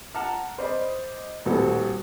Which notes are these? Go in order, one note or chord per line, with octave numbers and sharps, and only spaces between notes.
F#5 A5 A#5 F6
C5 D5 D#5 B5
D#1 A1 G3 C4 F#4 A4